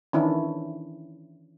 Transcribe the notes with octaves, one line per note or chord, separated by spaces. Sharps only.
D#3 E3 C#4 D4 E4